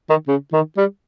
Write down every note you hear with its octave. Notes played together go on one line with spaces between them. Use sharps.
D#3
C#3
D#3
G3